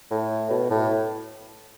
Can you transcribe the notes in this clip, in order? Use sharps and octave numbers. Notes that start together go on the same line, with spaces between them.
A2
B2
A2